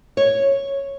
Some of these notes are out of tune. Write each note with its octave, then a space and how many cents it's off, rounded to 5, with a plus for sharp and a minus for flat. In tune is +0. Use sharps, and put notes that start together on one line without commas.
C#5 -5